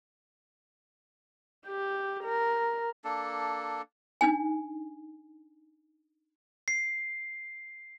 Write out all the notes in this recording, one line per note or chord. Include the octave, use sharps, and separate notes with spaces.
G4
A#4
A#3 D4 A4
D4 D#4 G#5
C7